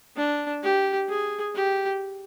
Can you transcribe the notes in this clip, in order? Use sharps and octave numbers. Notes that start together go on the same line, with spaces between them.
D4
G4
G#4
G4